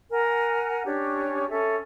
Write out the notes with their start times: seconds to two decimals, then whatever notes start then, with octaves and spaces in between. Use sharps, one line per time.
0.10 A#4 F#5 G#5
0.86 C#4 D4 G4 C#5
1.50 C#4 A4 E5